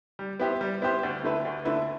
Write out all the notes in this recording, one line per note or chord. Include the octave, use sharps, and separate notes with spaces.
G3
B3 E4 G4 C5
G3
B3 E4 G4 C5
D2
D3 A3 E4 B4
D2
D3 A3 E4 B4